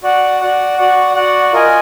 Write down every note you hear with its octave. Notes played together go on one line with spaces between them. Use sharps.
F#4 D5 F#5
F#4 D5 F#5
F#4 D5 F#5
F#4 D5 F#5
F4 A#4 D#5 G#5